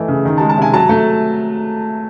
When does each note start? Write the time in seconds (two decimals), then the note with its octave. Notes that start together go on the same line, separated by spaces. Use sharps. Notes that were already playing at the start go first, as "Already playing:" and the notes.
Already playing: E3 A3 D#5
0.08 C#3
0.25 D#3
0.38 A5
0.41 G#3
0.49 A5
0.57 C3 G#5
0.74 F#3 A5
0.89 A3